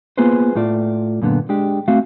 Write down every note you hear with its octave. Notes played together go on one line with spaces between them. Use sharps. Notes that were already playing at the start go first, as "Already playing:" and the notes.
A#3 B3 F4 G#4 B4 C5
A2 A3 F4 D5
F#2 A#2 D3 B3
G#3 D4 G4
A3 C4 F#4 F5